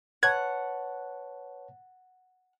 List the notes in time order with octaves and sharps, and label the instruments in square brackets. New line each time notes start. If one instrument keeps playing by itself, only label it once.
[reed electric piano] B4 C#5 A5 [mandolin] F#5 [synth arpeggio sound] G#6